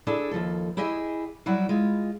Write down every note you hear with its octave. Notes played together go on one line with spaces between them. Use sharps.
D4 E4 G#4 A4
D#2 F3 A4
E4 G4 G#4 D#5 E5
F#3 G3 E4 F#4
G#3 F4